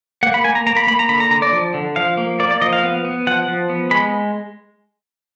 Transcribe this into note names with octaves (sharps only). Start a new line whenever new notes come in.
A#3 F#5
B5
A#3 G#5
A#5
A#3 A#5
B5
A#3 B5
A#5
D3 B5
A#5
D3 A#5
D5
F3
D3
F3 F5
A#3
A#3 D5
D5
F3 D#5
F5
B3
B3
F3 F#5
F3
B3
G#3 B5